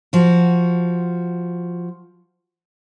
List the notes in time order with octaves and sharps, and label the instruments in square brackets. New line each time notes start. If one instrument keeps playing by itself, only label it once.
[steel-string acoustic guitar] F3 F#4